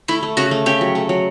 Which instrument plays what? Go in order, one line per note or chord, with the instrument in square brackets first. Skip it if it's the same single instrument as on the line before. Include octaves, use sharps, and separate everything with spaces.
[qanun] A3 [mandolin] E4
[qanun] A3
[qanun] C#3 [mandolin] F#4
[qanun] A3
[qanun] C#3 [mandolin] G4
[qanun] F#3
A3
F#3